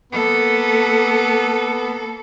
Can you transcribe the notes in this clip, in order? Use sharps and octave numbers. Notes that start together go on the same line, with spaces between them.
A#3 B3 A4